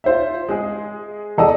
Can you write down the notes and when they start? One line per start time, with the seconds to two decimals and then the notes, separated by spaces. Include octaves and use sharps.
0.04 F4 C5 E5
0.49 G#3 G#4
1.38 E2 A4 D5 D#5